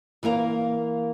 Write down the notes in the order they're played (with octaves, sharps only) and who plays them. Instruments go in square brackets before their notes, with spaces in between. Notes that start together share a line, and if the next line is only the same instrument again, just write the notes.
[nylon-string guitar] E3 A#3 A#4 F5